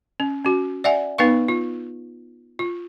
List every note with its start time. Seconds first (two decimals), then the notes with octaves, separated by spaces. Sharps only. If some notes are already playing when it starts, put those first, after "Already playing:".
0.20 C#4
0.44 C#4 F#4
0.84 D5 E5 F#5 G#5
1.18 B3 D#4 B4 F5 C#6
1.48 F4
2.59 F4